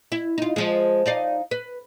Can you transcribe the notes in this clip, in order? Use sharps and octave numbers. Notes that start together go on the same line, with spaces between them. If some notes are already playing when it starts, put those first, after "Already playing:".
E4
D#4 F4
F3 G#3
D#4 D5 F5
B4